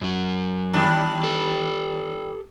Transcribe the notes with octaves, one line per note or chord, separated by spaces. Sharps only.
F#2 F#3
D#2 G3 D4
G4 A4